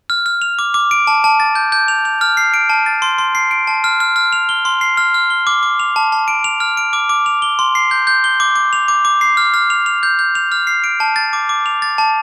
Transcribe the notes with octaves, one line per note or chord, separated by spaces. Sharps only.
F6
F6
F7
D6
D6
D7
A5
A5
A6
G6
G6
F7
F7
F6
C7
D7
A5
A6
C6
C6
C7
D7
A5
F6
F6
F6
F7
G7
C6
C7
F6
F6
G7
D6
D6
F7
A5
A5
D7
F7
F6
D7
D6
D6
F7
G7
C6
C7
G6
G6
G7
D6
D6
F7
D6
D6
C7
F6
F6
F7
F7
G6
G6
F7
F6
C7
D7
A5
A6
D6
D6
F7
A6
A5